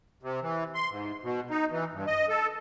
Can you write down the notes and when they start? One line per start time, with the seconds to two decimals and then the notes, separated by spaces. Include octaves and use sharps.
0.23 C3
0.42 E3
0.75 C6
0.90 G#2
1.23 B2
1.50 D#4
1.71 E3
1.93 G2
2.07 D#5
2.29 A4